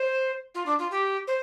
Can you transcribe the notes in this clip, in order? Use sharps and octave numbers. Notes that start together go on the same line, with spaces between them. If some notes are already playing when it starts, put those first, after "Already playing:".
Already playing: C5
F4
D4
F4
G4
C5